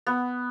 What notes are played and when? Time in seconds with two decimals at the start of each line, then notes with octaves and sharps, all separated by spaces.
0.07 B3